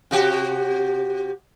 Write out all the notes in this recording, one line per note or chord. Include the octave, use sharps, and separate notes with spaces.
C3 F#4 G4